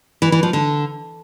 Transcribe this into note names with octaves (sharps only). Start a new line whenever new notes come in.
E3
E3
F3
D3